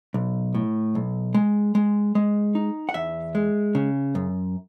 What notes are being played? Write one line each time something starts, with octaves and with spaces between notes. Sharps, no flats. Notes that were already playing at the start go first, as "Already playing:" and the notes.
B1
A2
B1
G#3
G#3
G#3
D#4
F#5
E2 E5
G#3
C#3
F#2